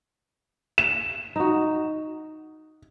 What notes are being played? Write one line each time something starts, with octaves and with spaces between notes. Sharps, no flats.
E7
D#4 F#4